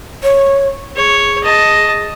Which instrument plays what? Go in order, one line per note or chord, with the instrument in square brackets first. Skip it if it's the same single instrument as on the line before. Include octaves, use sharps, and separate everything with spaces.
[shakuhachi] C#5
[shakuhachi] G#4 [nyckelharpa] C#5
[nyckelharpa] D#5 A5